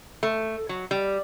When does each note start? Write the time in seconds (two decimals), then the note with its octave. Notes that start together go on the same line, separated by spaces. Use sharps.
0.23 A3
0.69 F#3
0.91 G3